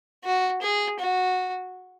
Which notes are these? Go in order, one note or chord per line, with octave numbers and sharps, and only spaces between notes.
F#4
G#4
F#4